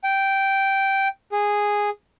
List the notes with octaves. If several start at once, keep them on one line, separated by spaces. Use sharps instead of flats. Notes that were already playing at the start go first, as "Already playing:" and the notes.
G5
G#4